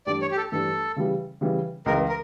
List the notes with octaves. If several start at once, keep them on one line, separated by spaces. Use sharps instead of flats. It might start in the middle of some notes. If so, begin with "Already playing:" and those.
G2 E3 A3 D4 G4 D5
C#5
G4
A4
G2 E3 A3 D4 G4 A4
C#3 E3 G3
C#3 E3 G3
C#2 C#3 E3 A#4
A#4